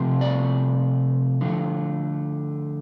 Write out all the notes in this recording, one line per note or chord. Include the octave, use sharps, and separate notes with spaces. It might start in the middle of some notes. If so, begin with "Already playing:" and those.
Already playing: C3 F3 A3 C4
D5
D3 F3 A3